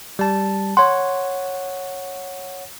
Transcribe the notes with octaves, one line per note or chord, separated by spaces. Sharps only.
G3 A5
C#5 F#5 C6